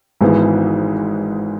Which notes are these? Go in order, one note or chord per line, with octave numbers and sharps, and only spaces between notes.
G#1 G#2 E3 G#3 B3